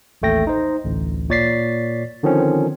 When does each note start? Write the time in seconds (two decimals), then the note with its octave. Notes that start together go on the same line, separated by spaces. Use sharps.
0.22 A1 D#2 A3 G5 A#6
0.47 D#4 C5
0.84 A1 D2
1.30 A#2 C#5 D5 A6 B6 C7
2.23 D3 D#3 F3 C4 C#4